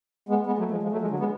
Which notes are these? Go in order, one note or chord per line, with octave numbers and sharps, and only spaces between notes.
G#3 B3
G#3 B3
F#3 A3
F3 G#3
F3 G#3
F#3 A3
F3 G#3
D3 F#3
G#3 B3